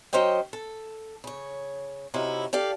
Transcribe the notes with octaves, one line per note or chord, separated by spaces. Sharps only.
F#3 C#4 C5 D#5 G5
A4
C#3 C#5
C3 C#4 D#4 E4 F#4
G4 A4 D5 F5